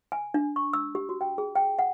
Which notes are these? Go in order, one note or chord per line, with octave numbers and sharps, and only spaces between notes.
G#5
D4
C#6
E6
G4
F#4
G5
G#4
G5
F#5